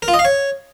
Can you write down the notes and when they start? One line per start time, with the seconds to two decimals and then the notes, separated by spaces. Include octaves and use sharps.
0.02 A#4
0.08 F4
0.14 D#5
0.19 F5
0.25 C#5